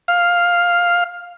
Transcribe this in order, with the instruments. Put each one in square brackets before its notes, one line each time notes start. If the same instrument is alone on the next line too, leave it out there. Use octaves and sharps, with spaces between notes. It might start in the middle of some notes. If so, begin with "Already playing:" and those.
[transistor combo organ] F5